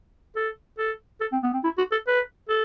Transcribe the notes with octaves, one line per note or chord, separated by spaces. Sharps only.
A4
A4
A4
C4
B3
C4
E4
F#4
A4
B4
A4